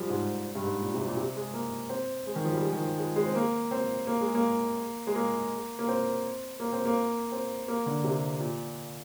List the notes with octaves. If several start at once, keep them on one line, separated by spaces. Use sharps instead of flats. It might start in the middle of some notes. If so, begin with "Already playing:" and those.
Already playing: F3 G3 G#3
G#2
G2
G#2
A#2
C3
A#2
C3
G#3
A#3
C4
G#3
D#3
F3
G3
G#3
D#3
F3
G#3
G#3
C4
A#3
C4
A#3
G#3
A#3
G#3
A#3
A#3
C4
A#3
C4
A#3
C4
A#3
D3
C3
A#2